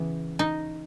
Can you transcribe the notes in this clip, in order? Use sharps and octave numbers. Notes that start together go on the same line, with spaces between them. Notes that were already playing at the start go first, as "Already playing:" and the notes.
Already playing: C#3 E3 B3
D#4